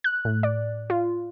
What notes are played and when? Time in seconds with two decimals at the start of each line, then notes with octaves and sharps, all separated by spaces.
0.04 F#6
0.25 A2
0.43 D5
0.90 F4